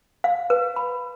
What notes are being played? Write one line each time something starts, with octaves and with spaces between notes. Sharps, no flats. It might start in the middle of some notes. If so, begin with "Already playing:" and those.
F5
B4
B5